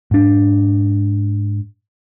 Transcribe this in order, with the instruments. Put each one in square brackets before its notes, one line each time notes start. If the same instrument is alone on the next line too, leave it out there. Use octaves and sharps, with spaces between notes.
[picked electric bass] G#2 D4